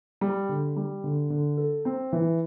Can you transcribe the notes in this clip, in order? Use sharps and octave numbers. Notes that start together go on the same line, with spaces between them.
G3
D3
G3
D3
D3
A4
C4
E3